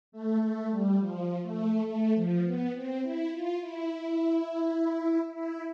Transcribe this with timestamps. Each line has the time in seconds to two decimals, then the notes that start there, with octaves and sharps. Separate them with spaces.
0.12 A3
0.41 A3
0.71 G3
0.99 F3
1.43 A3
1.86 A3
2.15 F3
2.45 B3
2.73 C4
3.02 E4
3.31 F4
3.60 E4
5.34 E4